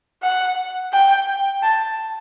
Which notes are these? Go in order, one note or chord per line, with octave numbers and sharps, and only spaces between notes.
F#5
G5
A5